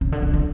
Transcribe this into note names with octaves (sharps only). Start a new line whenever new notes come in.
C#3
D3
D3
D3